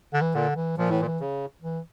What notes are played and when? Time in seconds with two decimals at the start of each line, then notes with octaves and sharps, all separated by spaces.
0.13 D3
0.21 E3
0.35 A#2 D3
0.56 E3
0.78 A#2 F3
0.89 A2 E3
1.01 A#2
1.06 E3
1.20 C#3
1.62 E3